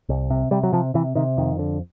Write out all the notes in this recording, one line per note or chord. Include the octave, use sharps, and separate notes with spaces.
C2
C3
C3 G3
F#3
C3 F3
C3 E3
C3 D#3
F2 D#3
D3